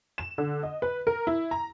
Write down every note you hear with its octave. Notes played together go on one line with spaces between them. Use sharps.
E7
D3
D#5
B4
A#4
E4
A#5